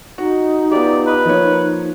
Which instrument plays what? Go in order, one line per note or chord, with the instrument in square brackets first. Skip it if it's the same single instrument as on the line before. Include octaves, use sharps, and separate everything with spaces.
[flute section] D#4 [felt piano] F#4
[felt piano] B3 F4 G4 [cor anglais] D5
[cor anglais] B4
[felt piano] F3 A#3 C#5